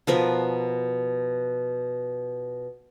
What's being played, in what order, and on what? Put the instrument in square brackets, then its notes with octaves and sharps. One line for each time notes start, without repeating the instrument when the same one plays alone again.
[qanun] B2 F3 A#4 B4